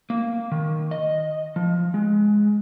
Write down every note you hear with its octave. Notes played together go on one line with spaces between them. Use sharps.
A#3
D#3
D#5
F3
G#3